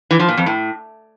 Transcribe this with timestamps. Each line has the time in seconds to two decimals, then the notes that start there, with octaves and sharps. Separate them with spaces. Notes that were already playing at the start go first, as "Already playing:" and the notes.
0.11 E3
0.20 F3
0.28 A#2
0.37 F2
0.46 A2